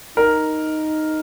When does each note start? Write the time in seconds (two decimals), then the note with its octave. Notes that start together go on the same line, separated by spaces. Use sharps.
0.17 D#4 A#4